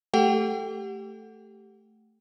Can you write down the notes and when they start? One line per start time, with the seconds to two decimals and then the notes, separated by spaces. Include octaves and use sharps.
0.14 A3 G4 A4 F#5 G5